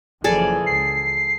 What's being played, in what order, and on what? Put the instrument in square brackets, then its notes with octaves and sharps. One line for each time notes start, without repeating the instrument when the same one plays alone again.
[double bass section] F#1 E3 F3 [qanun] G#4 A4 D5
[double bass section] C#2 [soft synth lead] C7